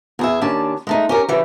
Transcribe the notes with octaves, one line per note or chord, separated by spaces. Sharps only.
E2 G#4 E5
D#2 C#4 D4 A5
G#3 A3 D#4
C#4 G4 A#4
C#3 E3 G3